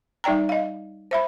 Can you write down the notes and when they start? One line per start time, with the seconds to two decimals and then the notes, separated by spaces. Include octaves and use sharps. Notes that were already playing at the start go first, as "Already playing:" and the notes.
0.24 G3 D#4 D5 G5 A#5
0.49 D#5 F5
1.11 C5 E5 B5